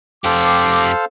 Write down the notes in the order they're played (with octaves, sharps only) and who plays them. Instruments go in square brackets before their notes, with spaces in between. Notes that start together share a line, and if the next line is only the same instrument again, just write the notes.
[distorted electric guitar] F2 G4 [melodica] A4 C5 F5 [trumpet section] D6